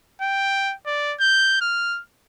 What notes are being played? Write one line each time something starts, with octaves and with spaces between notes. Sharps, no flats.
G5
D5
G6
F6